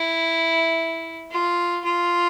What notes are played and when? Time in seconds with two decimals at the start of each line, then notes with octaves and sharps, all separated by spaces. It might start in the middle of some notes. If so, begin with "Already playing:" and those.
Already playing: E4
1.31 F4
1.84 F4